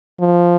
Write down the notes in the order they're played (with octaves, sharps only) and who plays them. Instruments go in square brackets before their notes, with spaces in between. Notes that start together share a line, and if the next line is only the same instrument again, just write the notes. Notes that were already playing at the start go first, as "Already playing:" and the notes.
[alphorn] F3